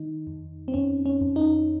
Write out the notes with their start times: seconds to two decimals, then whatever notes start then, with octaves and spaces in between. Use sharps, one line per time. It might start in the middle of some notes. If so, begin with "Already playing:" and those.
Already playing: D#3 D#4
0.27 F2
0.68 C4
0.74 F2 C#4
1.06 C#4
1.21 F2
1.36 D#4